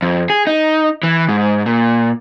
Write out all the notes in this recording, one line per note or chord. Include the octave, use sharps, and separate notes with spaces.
F2
G#4
D#4
E3
G#2
A#2